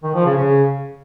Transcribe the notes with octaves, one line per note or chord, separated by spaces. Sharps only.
D#3
F3
C#3
C#3